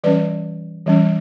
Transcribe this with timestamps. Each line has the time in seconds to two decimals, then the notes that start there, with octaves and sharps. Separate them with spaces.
0.04 E3 G3 C#4 B4 D5
0.86 E3 G3 C#4